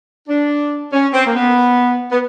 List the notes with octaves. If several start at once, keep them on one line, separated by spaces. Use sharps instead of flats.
D4
C#4
C4
A#3
B3
B3